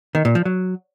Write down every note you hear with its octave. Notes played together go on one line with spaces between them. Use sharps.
D#3
A#2
F3
F#3